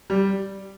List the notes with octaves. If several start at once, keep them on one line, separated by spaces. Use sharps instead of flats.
G3